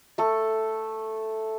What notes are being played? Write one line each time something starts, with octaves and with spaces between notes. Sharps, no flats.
A3 A4